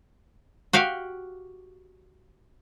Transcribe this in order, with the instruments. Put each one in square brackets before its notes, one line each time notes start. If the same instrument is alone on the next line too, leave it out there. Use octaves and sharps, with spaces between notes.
[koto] F#4 G4 F5